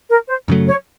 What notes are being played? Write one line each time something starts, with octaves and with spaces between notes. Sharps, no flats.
A#4
C5
F#2 C#3 F#3 A3
C#5